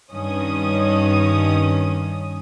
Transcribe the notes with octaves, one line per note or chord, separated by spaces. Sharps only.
G2 D#3 C#4 D#6